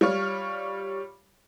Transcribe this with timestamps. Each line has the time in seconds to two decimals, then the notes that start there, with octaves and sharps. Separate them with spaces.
0.01 G3 F4 C#5 F6